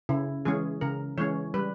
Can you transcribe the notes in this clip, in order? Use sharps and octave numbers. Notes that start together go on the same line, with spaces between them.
C#3 E4
E3 G#3 C#4 G#4
C#3 A#4
E3 G#3 C#4 C#5
G3 B4